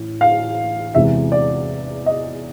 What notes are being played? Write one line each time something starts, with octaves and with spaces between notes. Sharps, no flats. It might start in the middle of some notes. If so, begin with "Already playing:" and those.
Already playing: A1 A2
F5
E2 C3 E3 G#3 E5
D5
D#5